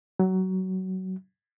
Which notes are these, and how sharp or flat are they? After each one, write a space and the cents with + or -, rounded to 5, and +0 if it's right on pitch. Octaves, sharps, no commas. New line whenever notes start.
F#3 +20